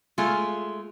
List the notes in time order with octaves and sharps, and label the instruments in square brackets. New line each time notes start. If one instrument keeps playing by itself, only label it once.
[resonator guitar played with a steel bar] G#3 A3 F4